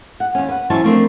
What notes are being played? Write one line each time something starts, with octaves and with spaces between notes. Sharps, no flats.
F#5
D#2 C#4
B4 F#5
E3 F#3 C#4 E4 C5 A5
F3 A3 C4 D4 A4 A#4